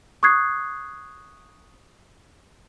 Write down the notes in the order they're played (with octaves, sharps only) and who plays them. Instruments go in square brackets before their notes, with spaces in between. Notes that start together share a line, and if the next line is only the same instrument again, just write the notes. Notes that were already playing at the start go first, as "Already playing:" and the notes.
[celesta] C#6 D#6 F#6 G#6 C7